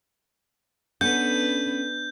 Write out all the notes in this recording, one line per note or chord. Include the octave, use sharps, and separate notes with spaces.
B3 C#4 D4 A4 B4 F#5 G6